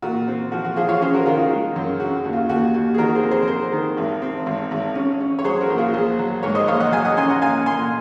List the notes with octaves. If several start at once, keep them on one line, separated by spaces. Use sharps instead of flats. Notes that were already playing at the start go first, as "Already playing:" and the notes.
A#2 F#4
C4
F3 F#4
F#4
F3 F4 G#4
C#5 F5
C#4 G#4 C5
F#4 A#4
D#3 F4 G#4
F4
G#3
F#2
C#3 F#4
D#2
F4
D#2 F#4
D#2
G#4
D#3 F#4 A#4
G#4 C5
F2
G#4 C5
A#4
F2 G#4 C5
D#3
G#1
C4
G#1
G#1
C#4
C#4
C#5
F#3 G#4 C5
F#4 A#4
A#1
F4 G#4
A#1 G#4 C5
F#3
G#2 A#4 C#5
C5 D#5
A#1 C#5 F5
D#5 F#5
F#3 F5 G#5
D#5 F#5
C#4 G#5 C6
F#5 A#5
A#2 F5 G#5
A#2 G#5 C6